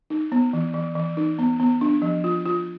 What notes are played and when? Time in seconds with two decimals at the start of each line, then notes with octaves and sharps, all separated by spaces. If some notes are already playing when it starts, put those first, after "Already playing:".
0.10 D#4
0.32 B3
0.53 E3
0.74 E3
0.95 E3
1.17 D#4
1.39 B3
1.60 B3
1.81 D4
2.02 F3
2.24 F4
2.45 F4